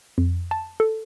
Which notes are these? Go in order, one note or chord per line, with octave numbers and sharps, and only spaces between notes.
F2
A5
A4